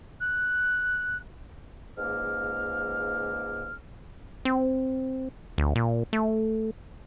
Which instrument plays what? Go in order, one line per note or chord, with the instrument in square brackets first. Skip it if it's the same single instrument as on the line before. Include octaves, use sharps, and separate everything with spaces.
[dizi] F#6
[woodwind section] C#2 G#2 A#3 F6
[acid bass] C4
D2
A#2
A3